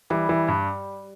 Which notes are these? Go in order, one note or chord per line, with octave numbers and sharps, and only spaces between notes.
E3 G3
E3
G2